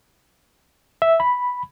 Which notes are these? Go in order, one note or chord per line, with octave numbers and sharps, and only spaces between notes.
E5
B5